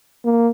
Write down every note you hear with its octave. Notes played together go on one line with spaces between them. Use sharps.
A#3